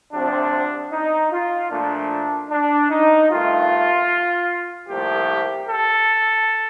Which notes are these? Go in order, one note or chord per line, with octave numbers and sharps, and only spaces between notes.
D2 C3 F3 C4 D4
D#4
F4
A#2 F3 A3 D4
D4
D#4
G2 D#3 A3 F4
C2 A#2 F3 A3 G4
A4